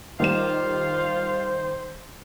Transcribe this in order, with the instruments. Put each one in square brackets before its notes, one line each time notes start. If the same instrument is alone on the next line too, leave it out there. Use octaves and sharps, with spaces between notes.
[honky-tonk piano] D#3 G3 E7 [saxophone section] F4 [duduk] C5